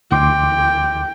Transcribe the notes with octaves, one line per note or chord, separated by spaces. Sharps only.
D2 G5 C6 D6